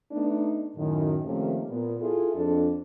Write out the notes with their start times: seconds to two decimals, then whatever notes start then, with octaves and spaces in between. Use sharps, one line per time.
0.12 A3 B3 D4 D#4
0.76 F#2 A2 D#3
1.24 C3 D#3 F3 A3 A#3 C#4
1.69 A#2 B3
2.00 E4 F4 G#4 A4
2.35 F2 D4 A4